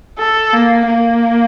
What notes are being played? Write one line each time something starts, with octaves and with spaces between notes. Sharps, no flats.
A4
A#3
A#3